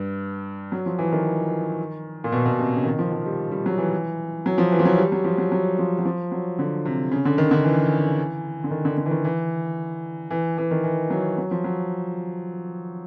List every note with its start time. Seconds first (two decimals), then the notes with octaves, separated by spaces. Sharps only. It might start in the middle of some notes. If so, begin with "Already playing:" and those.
Already playing: G2
0.72 F#3
0.86 F3
0.99 E3
1.12 D#3
2.24 A#2
2.32 B2
2.45 B2
2.59 C3
2.73 C#3
2.85 D#3
2.99 F3
3.12 F3
3.26 G3
3.51 G3
3.66 F#3
3.78 E3
4.46 F#3
4.58 F3
4.72 E3
4.80 F3
4.85 F#3
4.98 G3
5.12 F#3
5.25 F3
5.38 F#3
5.52 F#3
5.79 F3
5.99 F#3
6.05 F3
6.32 F#3
6.59 D3
6.85 C3
7.11 C#3
7.25 D3
7.38 D#3
7.51 D3
7.64 E3
8.64 D3
8.71 D#3
8.85 D3
8.97 D3
9.06 E3
9.11 D#3
9.25 E3
10.31 E3
10.58 E3
10.71 D#3
10.84 E3
11.10 F#3
11.38 F#3
11.51 F3
11.64 F#3